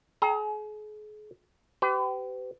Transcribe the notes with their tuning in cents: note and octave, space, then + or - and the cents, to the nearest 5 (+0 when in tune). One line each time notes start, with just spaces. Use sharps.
G#4 +40 G5 +0 A#5 +0
G4 -25 B4 +40